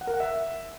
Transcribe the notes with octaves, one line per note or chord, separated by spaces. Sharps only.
F#5
A#4
F#5
E5